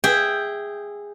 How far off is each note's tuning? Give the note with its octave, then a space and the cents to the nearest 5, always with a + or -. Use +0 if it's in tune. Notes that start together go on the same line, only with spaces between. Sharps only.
G#4 -15 E5 -5 G5 +0